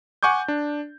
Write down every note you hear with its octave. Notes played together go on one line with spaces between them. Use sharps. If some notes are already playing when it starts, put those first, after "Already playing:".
F#5 G#5 C#6 D6 G6
D4